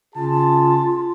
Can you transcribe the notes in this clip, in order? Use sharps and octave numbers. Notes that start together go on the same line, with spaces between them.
C#3 F4 G#4 A5